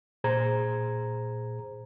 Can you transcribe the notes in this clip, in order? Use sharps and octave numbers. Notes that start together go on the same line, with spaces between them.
A#2 G#4 C5 A#5 G#6